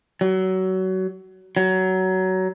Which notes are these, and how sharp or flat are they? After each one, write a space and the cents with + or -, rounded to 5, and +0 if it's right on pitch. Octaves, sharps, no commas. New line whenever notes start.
F#3 +25
F#3 +20